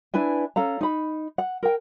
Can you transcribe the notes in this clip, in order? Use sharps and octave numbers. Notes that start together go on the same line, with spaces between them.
D4 E4 B4 G#5
C#4 A4 F5 A#5
D#4 B5
F#5
A#4 G5